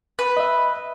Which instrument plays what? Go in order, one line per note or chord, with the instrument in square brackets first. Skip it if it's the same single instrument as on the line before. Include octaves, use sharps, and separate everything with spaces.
[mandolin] B4
[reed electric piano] D#5 E5